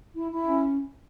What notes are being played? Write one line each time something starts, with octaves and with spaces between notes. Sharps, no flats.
E4
E4
C#4